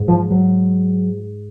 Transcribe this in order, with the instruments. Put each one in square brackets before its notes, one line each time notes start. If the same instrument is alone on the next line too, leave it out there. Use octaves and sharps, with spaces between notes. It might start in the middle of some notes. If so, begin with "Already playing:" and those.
Already playing: [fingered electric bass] G#2
F3
F#3